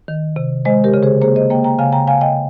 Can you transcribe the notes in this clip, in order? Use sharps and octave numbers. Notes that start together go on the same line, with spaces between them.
D#3
C3
G#3 C5 D#5
G4 A#4
C#3
G#4 C5
A#3 G#4 C5
C5 D#5
A#3 D#5 G5
G5 A#5
C#3 F5 G#5
G5 A#5
C#3 F5 G#5
D#5 G5